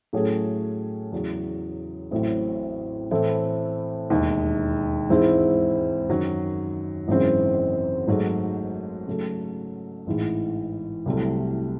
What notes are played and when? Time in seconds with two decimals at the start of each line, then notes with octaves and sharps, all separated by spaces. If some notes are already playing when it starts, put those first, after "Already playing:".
0.13 A2 F#3 A3 C#4 G#4
1.12 E2 C#3 F#3
2.11 A1 A2 F#3 C4 E4
3.11 A2 E3 A3 C4 E4
4.10 E1 D#2 D#3
5.10 G#2 E3 G#3 C4 E4
6.09 F#2 D#3 F#3
7.08 G#1 F#2 C#3 E3 C4
8.07 G#1 G#2 F#3 A3
9.07 C#3 F#3 A3
10.07 A1 G#2 E3
11.06 C2 C3 F#3 A3